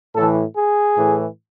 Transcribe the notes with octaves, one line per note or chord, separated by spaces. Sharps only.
A2 E3 A4
G#4
A2 E3